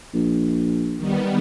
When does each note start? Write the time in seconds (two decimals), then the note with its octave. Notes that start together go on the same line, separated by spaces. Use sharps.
0.14 A#1
0.97 D#3 G3 B3